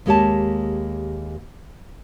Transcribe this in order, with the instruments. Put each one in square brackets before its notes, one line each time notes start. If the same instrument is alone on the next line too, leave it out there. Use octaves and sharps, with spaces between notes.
[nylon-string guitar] D#2 G#3 A#3 G4 C#5 A5